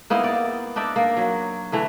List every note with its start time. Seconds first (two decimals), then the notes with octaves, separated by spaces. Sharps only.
0.10 A#3 B3 D#4 E4
0.24 D5
0.76 D4 D#4 D5 E5
0.96 A#3
1.17 F#3
1.72 D3 E3 A3